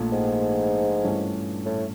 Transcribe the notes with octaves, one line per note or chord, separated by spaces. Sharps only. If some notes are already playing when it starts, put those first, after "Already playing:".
Already playing: A#1 A#2 F3 A3
G#2
G2 E3 A3 C#4
A2